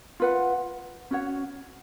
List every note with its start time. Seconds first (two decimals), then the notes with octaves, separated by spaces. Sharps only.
0.20 F4 B4 F#5
1.11 C#4 F#4 C#5 F#5